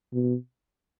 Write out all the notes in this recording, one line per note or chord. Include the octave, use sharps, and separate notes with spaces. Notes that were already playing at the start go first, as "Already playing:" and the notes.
B2